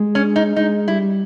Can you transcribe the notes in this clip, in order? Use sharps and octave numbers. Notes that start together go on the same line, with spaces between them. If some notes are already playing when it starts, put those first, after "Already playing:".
Already playing: G#3
C#4
D#4
G#3 D#4
G3 E4